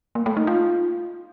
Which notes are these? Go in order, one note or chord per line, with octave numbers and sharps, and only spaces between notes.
A#3
A3
D#4
F4